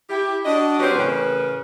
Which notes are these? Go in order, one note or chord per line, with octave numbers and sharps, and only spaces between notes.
E4 G4
D4 F#4 D#5
F#3 C4 C#4 F#4 G4 B4
A2 C#3 E3 A#4 B4